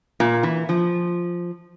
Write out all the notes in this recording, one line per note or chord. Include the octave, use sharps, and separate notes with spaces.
A#2
E3
F3